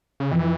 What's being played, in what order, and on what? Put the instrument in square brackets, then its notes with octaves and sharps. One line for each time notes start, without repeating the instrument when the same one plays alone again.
[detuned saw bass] C#3
[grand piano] F2 [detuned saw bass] E3